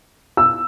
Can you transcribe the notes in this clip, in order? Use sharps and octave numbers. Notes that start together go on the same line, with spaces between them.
E6